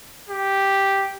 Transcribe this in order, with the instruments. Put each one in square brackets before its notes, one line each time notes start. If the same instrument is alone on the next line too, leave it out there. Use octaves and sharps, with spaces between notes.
[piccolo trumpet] G4